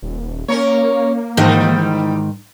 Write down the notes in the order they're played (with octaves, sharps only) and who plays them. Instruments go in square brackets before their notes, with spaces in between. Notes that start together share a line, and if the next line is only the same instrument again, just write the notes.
[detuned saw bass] D#1
[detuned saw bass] A#3 [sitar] C#4 A#4 C#5
[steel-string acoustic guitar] G#2 D#3 [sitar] E3 G3 D#5